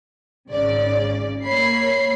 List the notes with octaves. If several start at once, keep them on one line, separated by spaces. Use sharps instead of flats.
G#1 C#3 D5
A#3 C#5 B5 C7